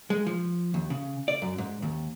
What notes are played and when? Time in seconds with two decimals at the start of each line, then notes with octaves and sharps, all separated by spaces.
0.10 G#3
0.27 F3
0.74 D#2
0.90 C#3
1.28 D5
1.42 F#2
1.58 G#2
1.82 D#2